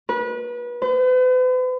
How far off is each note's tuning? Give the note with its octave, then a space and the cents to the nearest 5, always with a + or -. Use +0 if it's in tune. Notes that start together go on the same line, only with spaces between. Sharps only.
B4 -30
B4 +45